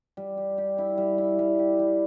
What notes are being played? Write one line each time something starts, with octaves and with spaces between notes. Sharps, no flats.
G3
G4
G4
E4
G3
E4
G3
G4
G3